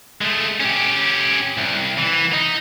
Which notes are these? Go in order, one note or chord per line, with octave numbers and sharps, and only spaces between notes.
G#3 A3
C#4 G4
C2
E3
D#4